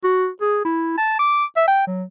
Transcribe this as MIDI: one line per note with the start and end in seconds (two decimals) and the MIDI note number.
0.04 0.28 66
0.41 0.60 68
0.65 0.96 64
0.97 1.15 81
1.19 1.45 86
1.56 1.65 76
1.68 1.86 79
1.87 2.03 54